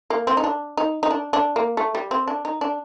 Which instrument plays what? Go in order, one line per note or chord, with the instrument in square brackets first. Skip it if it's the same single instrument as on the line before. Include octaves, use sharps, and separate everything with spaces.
[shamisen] A#3
C4
D#4
D4
D#4
D#4
D4
D4
A#3
A3
G3
C4
D4
D#4
D4